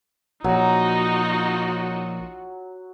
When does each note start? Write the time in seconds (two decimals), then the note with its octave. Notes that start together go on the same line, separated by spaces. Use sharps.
0.44 A#1 F#3 D#4 F4 F#4